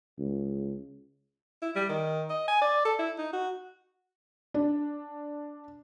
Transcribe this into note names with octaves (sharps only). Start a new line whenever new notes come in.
C#2
E4
G3
D#3
D#5
G#5
D5
A4
E4
D#4
F#4
D4